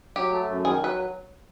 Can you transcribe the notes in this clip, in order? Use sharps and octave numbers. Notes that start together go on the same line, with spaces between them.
F#3 G4
A3
F#2
D#3 G#4
F#3 B4